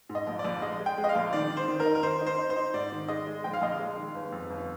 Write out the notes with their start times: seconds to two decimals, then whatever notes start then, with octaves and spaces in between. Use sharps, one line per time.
0.09 G#2
0.15 D#5
0.27 A#1
0.39 D5
0.44 A#1
0.62 G#3 D#5
0.80 G#3
0.86 G5
0.98 G#3
1.04 D#5
1.09 F5
1.15 A#1
1.33 D#3 D5
1.50 D#3
1.57 C5
1.68 D#3
1.80 A#4
1.85 D#4
1.95 A#4
2.03 D#3 C5
2.21 D#4
2.26 C5
2.39 D#4
2.50 C5
2.56 D#4
2.74 G#2 D5
2.92 D#3
3.08 G#3 D#5
3.26 G#3
3.44 A#1 G5
3.53 F5
3.61 A#1 D#5
3.71 F5
3.79 G#3
3.97 D#3
4.15 G1
4.32 F2
4.50 G1